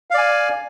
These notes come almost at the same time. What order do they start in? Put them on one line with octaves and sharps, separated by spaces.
F5 D5 G#5